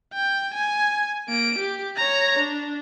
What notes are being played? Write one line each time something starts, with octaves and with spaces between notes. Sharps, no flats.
G5
G#5
A#3 D7
G4
C#5 A#5
D4